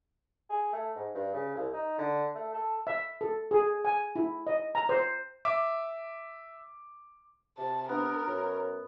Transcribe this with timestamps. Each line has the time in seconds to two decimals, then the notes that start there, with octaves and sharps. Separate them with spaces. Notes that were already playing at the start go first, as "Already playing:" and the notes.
0.50 G#4
0.73 A3
0.95 G#2
1.14 G2
1.33 C#3
1.55 C2
1.73 D#4
1.98 D3
2.35 A3
2.53 A4
2.87 E5
3.21 A4
3.51 G#4
3.85 G#5
4.16 E4
4.47 D#5
4.75 A#5
4.89 C5
5.45 E5 D6
7.58 C3 A5
7.89 B3 D4 A#4
8.27 F#2 C#5